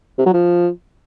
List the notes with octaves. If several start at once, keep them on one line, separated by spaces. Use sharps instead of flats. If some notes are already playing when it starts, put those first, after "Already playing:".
C3
F#3
F3